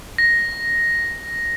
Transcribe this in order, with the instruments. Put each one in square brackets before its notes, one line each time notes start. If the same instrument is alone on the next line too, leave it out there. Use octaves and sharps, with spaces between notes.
[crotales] A#6